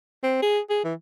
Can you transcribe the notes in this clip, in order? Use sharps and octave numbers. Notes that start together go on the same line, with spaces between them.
C4
G#4
G#4
E3